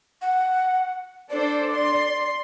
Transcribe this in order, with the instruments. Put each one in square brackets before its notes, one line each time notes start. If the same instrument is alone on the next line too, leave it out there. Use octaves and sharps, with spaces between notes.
[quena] F#5
[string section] D4 A4 C5 [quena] D5
[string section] C6